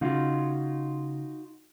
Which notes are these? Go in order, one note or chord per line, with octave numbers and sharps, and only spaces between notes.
C#3 D#4 F4 F#4